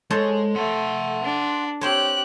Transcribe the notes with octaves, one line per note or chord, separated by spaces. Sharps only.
G#3 A4 C5 C#5
A3 F#5 C6
D4
C4 G4 C5 C#5 F#6